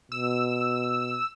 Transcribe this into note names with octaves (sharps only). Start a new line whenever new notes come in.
B2 E6